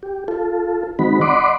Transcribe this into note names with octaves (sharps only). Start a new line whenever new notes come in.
G4
F4 A4
D#3 G#3 C4 D#4 F#4 B5
D5 D#5 F#5 B5 C6 D6